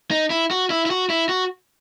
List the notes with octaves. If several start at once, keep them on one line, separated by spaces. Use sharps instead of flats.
D#4
E4
F#4
E4
E4
F#4
E4
F#4